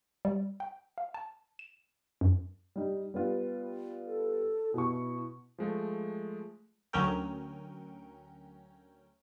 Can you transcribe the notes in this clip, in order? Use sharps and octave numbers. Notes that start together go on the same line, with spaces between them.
G3
G5
F5
A5
E7
F#2
G3 D#4
G3 B3 F4
A4
B2 E4 C#6
F3 G#3 A3
D2 F#3 C#4 A#4 G5